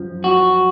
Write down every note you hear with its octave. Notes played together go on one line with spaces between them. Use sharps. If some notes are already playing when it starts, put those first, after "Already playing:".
Already playing: F#2 F3
F#4